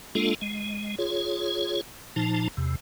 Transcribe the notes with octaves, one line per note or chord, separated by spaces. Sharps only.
G#3 A#3 D4 F4 A4
G#3
F4 G#4 C#5
A#2 F3 D#4 A5
E2 C3